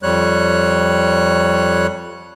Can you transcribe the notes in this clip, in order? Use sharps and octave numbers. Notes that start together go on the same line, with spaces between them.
F2 G3 C#5 F#6